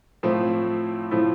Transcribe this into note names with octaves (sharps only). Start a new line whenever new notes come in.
A2 F3 A3 C4 E4
A2 F3 A3 C4 E4